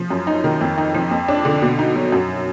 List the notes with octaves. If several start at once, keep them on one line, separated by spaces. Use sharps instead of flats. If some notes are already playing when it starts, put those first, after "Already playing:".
Already playing: F3
F#2
D#4
D#3
F2
D#4
F3
F2
D4
D3
B2
D#4
F#3
F#2